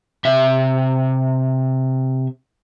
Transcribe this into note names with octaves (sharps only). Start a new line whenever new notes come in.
C3 E5